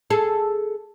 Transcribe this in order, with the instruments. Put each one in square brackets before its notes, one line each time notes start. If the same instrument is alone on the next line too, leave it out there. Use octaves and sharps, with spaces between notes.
[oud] G#4 A4